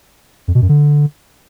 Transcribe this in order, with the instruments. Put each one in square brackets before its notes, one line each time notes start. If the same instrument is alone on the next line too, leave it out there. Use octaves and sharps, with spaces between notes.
[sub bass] F2
B2
F#2
D3